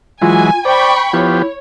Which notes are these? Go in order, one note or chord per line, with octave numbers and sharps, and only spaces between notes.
E3 F#3 G#3 F4 G#5
C5 D5 G5 B5 C#6
F3 B3 E4 G4 C#5